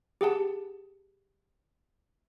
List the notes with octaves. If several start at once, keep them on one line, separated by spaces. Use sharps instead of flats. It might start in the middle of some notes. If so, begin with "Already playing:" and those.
G4 G#4 F#5 A5